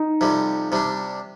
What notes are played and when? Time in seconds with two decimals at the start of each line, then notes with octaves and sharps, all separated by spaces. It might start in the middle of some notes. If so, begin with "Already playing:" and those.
Already playing: D#4
0.21 F2 C3 G3
0.72 C3 G3 D4